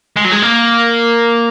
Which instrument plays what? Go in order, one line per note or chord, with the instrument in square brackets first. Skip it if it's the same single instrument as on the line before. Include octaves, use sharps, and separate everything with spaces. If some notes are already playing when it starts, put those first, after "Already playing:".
[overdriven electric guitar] G#3
F#3
G#3
A#3